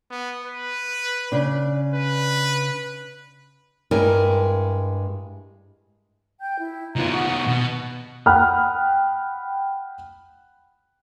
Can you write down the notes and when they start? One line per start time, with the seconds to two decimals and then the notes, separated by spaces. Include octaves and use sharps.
0.10 B3
0.45 B4
1.32 C#3 D4
1.94 B4
3.91 G2 G#3 E4 A#4
6.40 G5 G6
6.60 E4
6.96 D#3 B3 F4 A#5 G#6
7.12 F#5 C#6 D#6
7.47 B2
8.26 F#5 G5 B5 D#6 F6 F#6